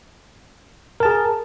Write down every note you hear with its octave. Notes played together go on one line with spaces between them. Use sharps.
G#4 A#4 A5